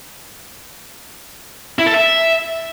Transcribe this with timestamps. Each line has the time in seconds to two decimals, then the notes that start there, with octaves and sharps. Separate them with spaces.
1.79 E4
1.86 A4
1.94 E5